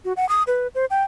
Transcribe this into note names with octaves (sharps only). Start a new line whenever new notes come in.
F#4
F#5
D#6
B4
C5
G5